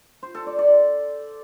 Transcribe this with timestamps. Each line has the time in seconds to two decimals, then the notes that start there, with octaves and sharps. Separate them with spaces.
0.23 C5
0.35 A4
0.47 D5
0.59 D5